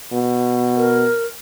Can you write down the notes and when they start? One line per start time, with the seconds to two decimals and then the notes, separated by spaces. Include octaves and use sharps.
0.12 B2
0.77 A#4